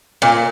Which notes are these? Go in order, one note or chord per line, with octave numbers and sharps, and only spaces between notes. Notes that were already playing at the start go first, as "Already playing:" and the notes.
A#2